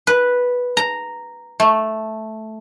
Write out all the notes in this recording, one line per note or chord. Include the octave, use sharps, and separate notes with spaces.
B4
A#5
A3